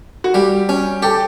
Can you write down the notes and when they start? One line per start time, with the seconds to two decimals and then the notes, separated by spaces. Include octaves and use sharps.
0.24 F#4
0.34 G3 G4
0.69 C#4
1.02 G4 A4